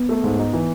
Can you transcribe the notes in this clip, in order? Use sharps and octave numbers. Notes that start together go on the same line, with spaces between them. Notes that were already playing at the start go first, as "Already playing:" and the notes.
Already playing: B3
A3
G#2
D#4
E3